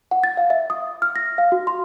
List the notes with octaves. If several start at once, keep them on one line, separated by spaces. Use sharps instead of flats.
F#5
A6
F5
E5
D#6
F6
A#6
F5
F#4
C6